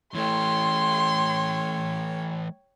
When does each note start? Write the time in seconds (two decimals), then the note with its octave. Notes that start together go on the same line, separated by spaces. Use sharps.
0.15 E3 A3 C#5 G5 C6